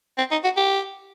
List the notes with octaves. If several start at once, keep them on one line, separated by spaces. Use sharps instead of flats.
C4
D#4
F#4
G4